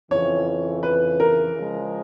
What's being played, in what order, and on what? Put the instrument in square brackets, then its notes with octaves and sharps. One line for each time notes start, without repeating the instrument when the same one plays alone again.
[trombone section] F2 C#3 E3 [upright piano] C#5
[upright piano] B4
A#4
[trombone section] C#3 F3 G#3